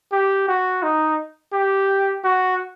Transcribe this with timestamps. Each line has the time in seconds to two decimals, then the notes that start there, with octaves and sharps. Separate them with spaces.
0.12 G4
0.48 F#4
0.83 D#4
1.53 G4
2.24 F#4